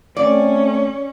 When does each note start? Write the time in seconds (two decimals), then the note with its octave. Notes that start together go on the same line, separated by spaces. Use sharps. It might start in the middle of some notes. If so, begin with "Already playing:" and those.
0.17 A3 C4 C#4 D5